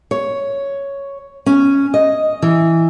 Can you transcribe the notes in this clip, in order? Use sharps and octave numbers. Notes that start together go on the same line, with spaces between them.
C#5
C#4
D#5
E3